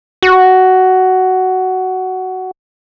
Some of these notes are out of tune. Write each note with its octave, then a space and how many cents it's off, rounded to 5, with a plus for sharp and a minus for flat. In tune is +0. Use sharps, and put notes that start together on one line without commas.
F#4 +10